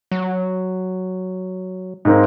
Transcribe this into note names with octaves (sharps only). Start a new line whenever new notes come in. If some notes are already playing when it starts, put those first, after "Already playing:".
F#3
G#2 A#3 C4